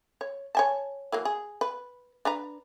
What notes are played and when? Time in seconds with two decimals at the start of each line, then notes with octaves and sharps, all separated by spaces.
0.21 C#5
0.55 C#5 G#5 A5
1.12 E3 F#3 A#3
1.25 G#4
1.61 B4
2.25 D4 B4 A#5